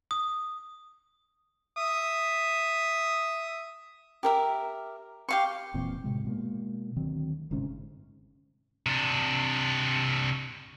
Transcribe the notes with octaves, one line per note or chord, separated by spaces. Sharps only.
D#6
E5 D#6
G4 A#4 E5
G4 F5 C#6
E1 A#2 E3 C4
A2 C3 G#3
B2 G#3 A#3
D2 D#3 F#3 C4
G1 G#2 C3 C#4
C3 D4